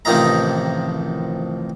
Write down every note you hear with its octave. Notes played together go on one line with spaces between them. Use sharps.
A1 C3 D#3 F3 D#5 A#5